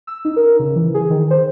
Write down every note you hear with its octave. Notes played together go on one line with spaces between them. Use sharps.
E6
D#4
A#4
C#3
E3
G#4
D#3
C5